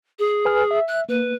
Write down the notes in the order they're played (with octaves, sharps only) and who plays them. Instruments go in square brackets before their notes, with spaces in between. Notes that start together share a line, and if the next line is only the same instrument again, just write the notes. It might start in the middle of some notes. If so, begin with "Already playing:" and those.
[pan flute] G#4
[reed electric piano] B4 G#5 F6
E5
[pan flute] F#6
[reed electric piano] A#3 [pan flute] B4